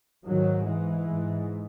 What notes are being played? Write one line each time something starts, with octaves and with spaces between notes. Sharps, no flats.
G#2 D#3 F#3
E3 G#3
G#2